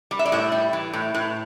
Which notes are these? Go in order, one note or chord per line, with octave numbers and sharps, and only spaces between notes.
G3
E5
D5
A2 E5
G3
E3
A2
A2